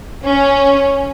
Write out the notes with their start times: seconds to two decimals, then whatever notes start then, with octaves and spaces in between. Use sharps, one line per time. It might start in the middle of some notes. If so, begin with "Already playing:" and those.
0.25 C#4